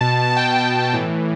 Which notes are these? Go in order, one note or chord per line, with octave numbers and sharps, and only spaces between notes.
B2 A5
A5
G5
A5
G5
A2 E3